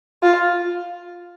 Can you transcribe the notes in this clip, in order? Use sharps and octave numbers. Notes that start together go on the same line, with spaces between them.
F4